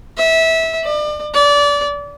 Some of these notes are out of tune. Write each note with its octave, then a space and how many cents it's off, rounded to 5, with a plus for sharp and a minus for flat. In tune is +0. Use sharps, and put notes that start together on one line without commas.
E5 -20
D5 +35
D5 -25